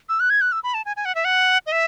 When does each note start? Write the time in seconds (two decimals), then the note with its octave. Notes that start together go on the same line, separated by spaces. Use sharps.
0.09 E6
0.20 F#6
0.30 G#6
0.41 F#6
0.52 E6
0.63 B5
0.74 A5
0.86 G#5
0.97 G#5
1.05 F#5
1.15 E5
1.25 F#5
1.66 D#5
1.72 E5